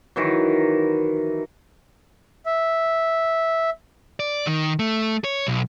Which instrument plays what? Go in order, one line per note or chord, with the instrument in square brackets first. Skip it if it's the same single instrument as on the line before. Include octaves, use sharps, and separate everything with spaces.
[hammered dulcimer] D#3 E3 F#3
[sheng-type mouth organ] E5
[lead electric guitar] D5
D#3
A3
C#5
B1